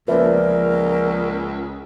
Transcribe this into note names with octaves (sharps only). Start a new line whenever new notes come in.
C#2 F3 A#3 A#4 B4 D5 E5